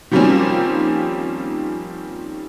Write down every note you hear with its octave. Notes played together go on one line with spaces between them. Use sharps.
D#3 F3 G3 A#3 C4 C#4